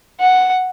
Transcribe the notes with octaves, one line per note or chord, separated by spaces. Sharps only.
F#5